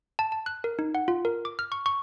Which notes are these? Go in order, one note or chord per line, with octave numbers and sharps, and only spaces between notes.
A5
A5
F#6
A#4
D#4
F#5
F4
A#4
D6
F6
C#6
C#6